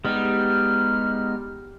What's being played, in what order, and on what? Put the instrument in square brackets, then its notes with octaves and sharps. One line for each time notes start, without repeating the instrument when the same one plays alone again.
[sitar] G3 [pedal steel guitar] G#3 B3 D#4 [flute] F6